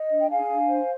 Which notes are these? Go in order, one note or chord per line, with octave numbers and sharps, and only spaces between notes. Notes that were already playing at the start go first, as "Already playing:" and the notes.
Already playing: D#5
D4
G5
G#4 F5 G#5
D4
C5